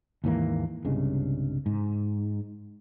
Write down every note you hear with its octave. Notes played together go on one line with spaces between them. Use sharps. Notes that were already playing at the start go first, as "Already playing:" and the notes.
D#2 G#2 E3 A#3
C2 G2 C#3 G#3
G#2